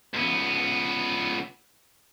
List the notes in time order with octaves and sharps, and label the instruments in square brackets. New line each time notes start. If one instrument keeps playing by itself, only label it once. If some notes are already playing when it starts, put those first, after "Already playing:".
[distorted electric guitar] C#2 B3